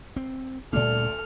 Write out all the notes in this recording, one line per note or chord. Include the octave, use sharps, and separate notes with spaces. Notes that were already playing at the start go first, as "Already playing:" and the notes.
C4
D2 A#2 G3 D4 A4 D5 F6